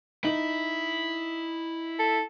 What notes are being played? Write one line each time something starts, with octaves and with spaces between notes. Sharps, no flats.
D#4 E4 F#7
A4